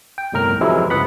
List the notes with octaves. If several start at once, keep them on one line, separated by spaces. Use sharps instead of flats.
G5
G1 C2 A2 A#4 F6
F2 C3 E3 F#3 G#3 E4
G1 C#2 B3 F#5 B5